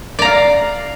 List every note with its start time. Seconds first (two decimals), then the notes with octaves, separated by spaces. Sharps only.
0.19 D5
0.22 A#5
0.25 F5